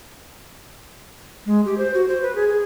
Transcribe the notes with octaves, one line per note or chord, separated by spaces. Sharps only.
G#3
G4
C5
F#4
C5
B4
G#4
G#4